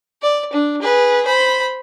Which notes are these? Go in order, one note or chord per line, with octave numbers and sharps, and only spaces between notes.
D5
D4
G#4 B4
C5 B5